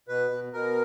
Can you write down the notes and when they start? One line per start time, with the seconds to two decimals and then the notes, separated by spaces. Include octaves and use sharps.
0.08 B2 B4
0.30 B2
0.53 B2 A#4